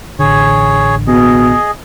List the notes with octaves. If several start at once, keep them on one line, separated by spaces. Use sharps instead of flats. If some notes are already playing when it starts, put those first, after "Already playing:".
A1 D3 G#4 C#5
B2 G#4 D#5